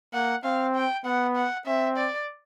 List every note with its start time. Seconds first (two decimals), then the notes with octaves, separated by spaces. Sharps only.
0.14 A#3 F#5
0.44 C4 F5
0.75 G5
1.05 B3 F#5
1.36 F#5
1.66 C4 E5
1.97 D5